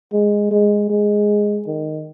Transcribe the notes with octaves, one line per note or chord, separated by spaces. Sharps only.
G#3
G#3
G#3
D#3